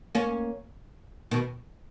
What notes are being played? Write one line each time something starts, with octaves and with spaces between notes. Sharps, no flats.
A#3 C#4
B2 D#3